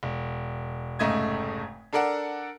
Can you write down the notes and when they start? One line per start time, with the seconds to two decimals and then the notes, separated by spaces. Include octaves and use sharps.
0.03 E1
0.99 F1 G#2 C#3 A3 D#5 G#6
1.93 D4 A4 A#4 D5 F#5